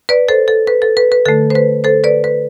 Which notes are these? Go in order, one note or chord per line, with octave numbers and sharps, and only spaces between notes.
B4 D5
A4 C5
A4
B4
A4
B4
B4
D3 A3 A4
C5
B4
A4 C5
B4 D5
B4